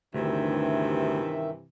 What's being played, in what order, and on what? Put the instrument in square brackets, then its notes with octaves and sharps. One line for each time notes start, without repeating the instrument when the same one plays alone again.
[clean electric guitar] D2 [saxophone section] G2 C3 E3 [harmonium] D#3 E5